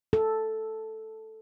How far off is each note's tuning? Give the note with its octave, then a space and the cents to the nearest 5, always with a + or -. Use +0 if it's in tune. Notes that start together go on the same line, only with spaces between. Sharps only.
A4 +0